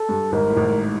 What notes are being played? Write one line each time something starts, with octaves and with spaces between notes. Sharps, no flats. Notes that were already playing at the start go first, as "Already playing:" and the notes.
Already playing: A4
G2
G#1 G#2 A#4
A2
G#1 G#2